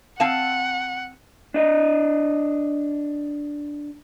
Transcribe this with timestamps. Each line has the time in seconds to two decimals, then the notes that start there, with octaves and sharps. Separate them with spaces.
0.20 C4 F5 F#5 A5
1.54 D4 D#5